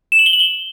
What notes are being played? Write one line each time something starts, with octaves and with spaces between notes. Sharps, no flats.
E7
F#7
G7
F#7
G7